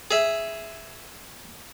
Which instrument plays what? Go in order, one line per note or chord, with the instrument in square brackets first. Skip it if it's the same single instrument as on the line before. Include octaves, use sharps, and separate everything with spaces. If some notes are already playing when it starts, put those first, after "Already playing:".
[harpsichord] G#4 E5